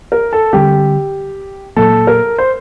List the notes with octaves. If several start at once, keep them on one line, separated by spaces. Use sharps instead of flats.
A#4
A4
D3 G3 C4 G4
A#2 F#3 A#3 A4
A#4
C5